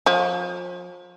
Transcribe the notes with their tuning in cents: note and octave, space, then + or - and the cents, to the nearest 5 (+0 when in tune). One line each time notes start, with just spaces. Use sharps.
F3 +35